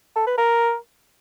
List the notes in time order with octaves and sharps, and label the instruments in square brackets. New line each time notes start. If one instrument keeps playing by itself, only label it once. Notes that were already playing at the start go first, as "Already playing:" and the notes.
[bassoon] A4
B4
A#4